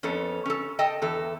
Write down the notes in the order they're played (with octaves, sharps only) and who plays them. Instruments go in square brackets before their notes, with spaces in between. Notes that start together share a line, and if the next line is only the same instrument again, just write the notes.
[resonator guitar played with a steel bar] F2 B3 C#4 A4
C#4 A4
A4 D#5 G5 A5
E2 A4